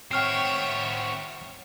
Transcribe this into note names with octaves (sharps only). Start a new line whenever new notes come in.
C4 F#4 C#5 E5 G5 F6 C7